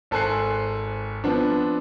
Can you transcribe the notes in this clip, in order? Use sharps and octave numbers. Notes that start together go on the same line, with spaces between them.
G#1 A4 C5 G#5 F#6 C7
F3 B3 C4 D4